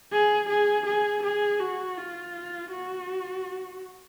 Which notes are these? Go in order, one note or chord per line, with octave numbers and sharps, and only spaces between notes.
G#4
G#4
G#4
G#4
F#4
F4
F#4